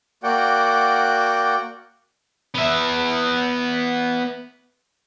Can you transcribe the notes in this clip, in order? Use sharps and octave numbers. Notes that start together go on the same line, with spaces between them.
A#3 F#4 D5 F#5 G5
B3 E5